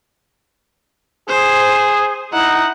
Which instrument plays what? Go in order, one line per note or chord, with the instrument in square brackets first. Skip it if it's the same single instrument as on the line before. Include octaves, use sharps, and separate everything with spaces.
[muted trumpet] G#4 [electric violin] C5
[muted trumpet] D#4 [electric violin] E4 F#5